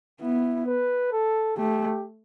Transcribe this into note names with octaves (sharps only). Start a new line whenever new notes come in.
B3 E4
B4
A4
A3 G4